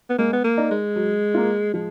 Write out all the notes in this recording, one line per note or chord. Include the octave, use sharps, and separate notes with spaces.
B3
G#3 A#3
B3
A#3
D#4 A#4 D5
G#3
F#3
A#3 F4
F3 G#3